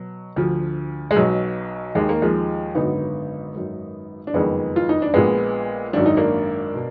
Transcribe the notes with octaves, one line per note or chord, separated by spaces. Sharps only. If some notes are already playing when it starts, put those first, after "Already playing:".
Already playing: B2 F#3
D2 D3 F3
G#3
B1 B2 F#3
D#2 D#3 G#3
A#3
F3 G#3
G#1 F#2 D3 B3 D#4
G#1 F#2 D#3
D4
F#1 F2 D#3 G#3 B3
F4
D#4
D4
A#1 A#2 G#3 B3
G#1 F#2 D#3 D4
D#4
A#3 D4
B2